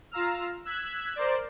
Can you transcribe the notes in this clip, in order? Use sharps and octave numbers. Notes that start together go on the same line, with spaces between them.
F4 F5 A#5 E6 F6
E6 F#6 G#6 B6
A#4 C5 D5